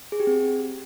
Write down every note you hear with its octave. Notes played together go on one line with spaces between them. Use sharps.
G#4
G4
C4